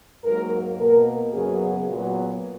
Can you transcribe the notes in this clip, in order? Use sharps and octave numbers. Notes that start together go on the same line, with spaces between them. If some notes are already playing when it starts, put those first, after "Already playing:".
G#2 F#3 A#3 A#4
B2 A#3 A#4
F#2 C#3 F#3 B3 G#4
A#2 F#3 B3